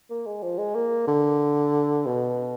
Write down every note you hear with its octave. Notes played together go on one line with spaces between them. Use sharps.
A#3
G#3
F3
G#3
A#3
D3
B2